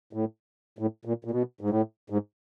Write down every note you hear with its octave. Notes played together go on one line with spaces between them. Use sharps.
A2
A2
A#2
A#2
B2
G#2
A2
G#2